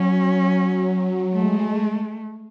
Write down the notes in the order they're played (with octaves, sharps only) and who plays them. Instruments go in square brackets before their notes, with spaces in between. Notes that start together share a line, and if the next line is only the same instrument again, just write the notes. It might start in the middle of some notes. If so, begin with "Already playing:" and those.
Already playing: [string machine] F#3 [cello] C#4
[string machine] G#3 [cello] A3